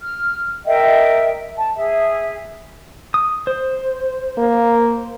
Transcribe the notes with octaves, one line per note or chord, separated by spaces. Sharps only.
F6
A#4 D#5 E5 G5
A5
G#4 E5
D#6
C5
A#3